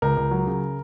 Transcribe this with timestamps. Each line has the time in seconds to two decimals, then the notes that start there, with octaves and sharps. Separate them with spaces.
0.02 C#2 A#4
0.17 C#2
0.31 F#3
0.47 C#3